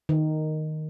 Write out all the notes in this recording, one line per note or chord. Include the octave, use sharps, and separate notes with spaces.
D#3